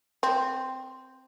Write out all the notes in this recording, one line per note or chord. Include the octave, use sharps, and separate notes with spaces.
C4